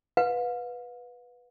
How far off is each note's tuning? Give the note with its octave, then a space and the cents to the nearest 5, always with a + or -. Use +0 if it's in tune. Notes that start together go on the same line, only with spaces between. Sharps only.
B4 +0 F5 +40